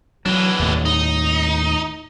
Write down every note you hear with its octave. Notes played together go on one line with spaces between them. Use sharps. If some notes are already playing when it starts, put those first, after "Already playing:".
E3 F#3 D4
D#2 A2
D#4